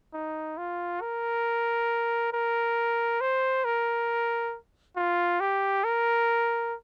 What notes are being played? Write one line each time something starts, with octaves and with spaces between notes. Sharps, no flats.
D#4
F4
A#4
A#4
C5
A#4
F4
G4
A#4